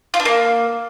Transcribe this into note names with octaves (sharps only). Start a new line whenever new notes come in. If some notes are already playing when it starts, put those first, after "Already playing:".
F4
D4
A#3